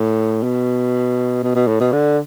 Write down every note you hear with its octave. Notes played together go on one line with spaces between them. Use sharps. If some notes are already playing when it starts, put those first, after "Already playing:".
Already playing: A2
B2
B2
B2
A2
B2
D3